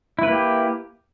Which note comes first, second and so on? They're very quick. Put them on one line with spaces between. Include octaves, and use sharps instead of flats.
E4 B4 A#3 G4